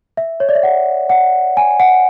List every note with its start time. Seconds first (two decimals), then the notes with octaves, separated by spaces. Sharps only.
0.17 E5
0.40 C#5
0.49 D5
0.55 E5
0.63 F#5
1.10 F#5
1.57 G#5
1.80 F#5